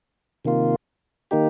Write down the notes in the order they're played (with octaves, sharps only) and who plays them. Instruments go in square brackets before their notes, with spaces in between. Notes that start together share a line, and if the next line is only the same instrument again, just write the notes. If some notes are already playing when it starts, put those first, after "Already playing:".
[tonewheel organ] C3 D#3 A#3 F4
D#3 A#3 D#4 G4